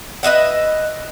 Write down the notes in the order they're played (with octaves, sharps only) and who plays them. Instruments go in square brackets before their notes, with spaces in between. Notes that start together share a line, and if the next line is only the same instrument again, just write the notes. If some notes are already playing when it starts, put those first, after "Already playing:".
[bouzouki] B4 D#5 E5 F#5